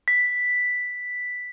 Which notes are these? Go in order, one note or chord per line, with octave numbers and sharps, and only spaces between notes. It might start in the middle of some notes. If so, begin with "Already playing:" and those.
B6